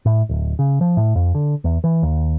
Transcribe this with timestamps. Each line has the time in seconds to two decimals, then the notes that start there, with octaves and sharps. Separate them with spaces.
0.06 A2
0.29 D1
0.59 C#3
0.81 F3
0.97 A2
1.15 F2
1.35 D3
1.64 E2
1.84 E3
2.03 D#2